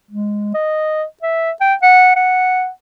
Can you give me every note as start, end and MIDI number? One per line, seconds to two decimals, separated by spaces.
0.11 0.50 56
0.54 1.04 75
1.22 1.51 76
1.61 1.74 79
1.82 2.14 78
2.16 2.68 78